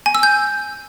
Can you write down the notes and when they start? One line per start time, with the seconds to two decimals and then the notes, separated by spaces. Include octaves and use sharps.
0.06 G#5
0.15 E6
0.23 G6